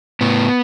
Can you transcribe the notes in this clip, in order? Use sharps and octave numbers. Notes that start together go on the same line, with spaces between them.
A2 B3